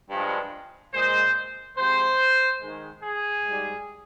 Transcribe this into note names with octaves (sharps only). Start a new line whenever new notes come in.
G2 F3 G#3
A#2 G#3 C5
C3 F3 G#3 C5
G#2 D#3 G#3
G#4
G#2 G3